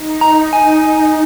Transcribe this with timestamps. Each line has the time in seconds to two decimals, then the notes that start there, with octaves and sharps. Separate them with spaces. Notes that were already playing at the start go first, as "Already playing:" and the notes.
Already playing: D#4
0.21 A#5
0.53 G#5